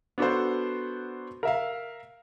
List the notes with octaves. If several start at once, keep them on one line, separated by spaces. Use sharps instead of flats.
B3 D4 F#4 A4 C5
A#4 E5 F5